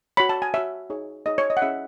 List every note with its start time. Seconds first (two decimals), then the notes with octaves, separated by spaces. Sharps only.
0.17 F#4 C#5 B5
0.29 A5
0.42 G#5
0.54 F#4 C#5 E5
0.90 D#4 G#4 C#5
1.26 D#4 G#4 C#5 D#5
1.38 C#5
1.50 D#5
1.57 F#5
1.62 C#4 E4 G#4 C#5 E5